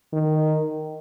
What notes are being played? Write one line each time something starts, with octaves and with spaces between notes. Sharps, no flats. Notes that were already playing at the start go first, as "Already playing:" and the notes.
D#3